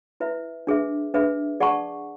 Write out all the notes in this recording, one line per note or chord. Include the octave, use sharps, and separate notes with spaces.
E4 B4 E5
D4 G#4 B4 E5
D4 G#4 B4 E5
G#4 D5 F#5 A5 C#6